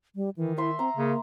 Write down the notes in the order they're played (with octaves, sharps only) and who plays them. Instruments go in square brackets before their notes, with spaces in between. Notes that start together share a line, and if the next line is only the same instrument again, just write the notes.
[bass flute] G3
[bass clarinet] D#3 [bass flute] E3
[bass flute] E4 [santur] E5 C6
[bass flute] C4 [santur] A#5
[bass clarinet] C#3 [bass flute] A#3